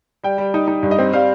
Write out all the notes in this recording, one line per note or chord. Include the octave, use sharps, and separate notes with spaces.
G3 G5
G3
D#4
D#4
G2
D#5
C4
G3 F5